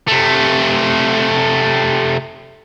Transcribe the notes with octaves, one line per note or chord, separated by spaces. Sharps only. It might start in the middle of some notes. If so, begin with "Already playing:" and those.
C3 A3